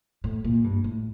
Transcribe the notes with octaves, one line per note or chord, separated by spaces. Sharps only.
A2
A#2
G2
A2